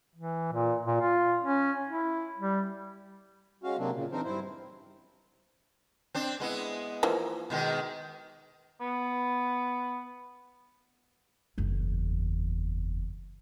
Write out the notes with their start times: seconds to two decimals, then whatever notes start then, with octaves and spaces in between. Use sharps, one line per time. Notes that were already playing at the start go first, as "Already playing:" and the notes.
0.15 E3
0.52 A#2
0.87 A#2
1.01 F4
1.41 C#4
1.88 E4
2.38 G3
3.64 G#3 C#4 F#4 F5
3.78 C3 F#3 A#3 C4 D4
3.94 A#2 C#3
4.12 E3 C4 D4 D#4 A#4 C5
4.24 G2 C4 E4 C5
6.15 C4 D4
6.40 G#3 B3 E4
7.03 E3 F3 A#3
7.50 B2 D#3 G#3
8.81 B3
11.58 F#1 E2